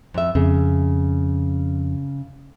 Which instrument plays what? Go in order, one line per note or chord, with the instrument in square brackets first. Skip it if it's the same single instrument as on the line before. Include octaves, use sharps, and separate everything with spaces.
[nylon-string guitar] F2 E5
[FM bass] F2 [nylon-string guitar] C#3